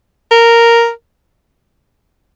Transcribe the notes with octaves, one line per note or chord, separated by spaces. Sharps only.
A#4